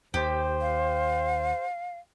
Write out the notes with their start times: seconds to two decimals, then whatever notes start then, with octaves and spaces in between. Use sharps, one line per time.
0.14 D#2 G4 C5
0.61 F5